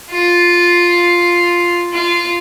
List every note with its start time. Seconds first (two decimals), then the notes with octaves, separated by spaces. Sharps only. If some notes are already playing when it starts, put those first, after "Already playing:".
0.11 F4
1.93 F4